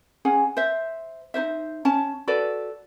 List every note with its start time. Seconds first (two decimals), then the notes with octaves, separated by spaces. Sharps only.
0.25 C#4 G#4 F#5 G#5
0.57 C5 E5
1.34 D#4 F4 C5 E5
1.85 C#4 A5
2.27 F#4 A4 B4 D5